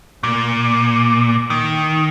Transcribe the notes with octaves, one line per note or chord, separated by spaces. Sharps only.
A#2
D#3